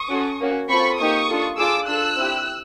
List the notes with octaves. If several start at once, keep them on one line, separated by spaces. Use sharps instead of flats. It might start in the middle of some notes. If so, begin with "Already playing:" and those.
Already playing: C#6 D#6
C#4 F#4 A4
A#3 C#4 F#4
C4 F4 A4 B5 C#6
A#3 D#4 G4 C#6 D#6
D4 F4 A4
D4 F4 G#4 D6 E6
D4 F4 A4 E6 F#6
C4 E4 G4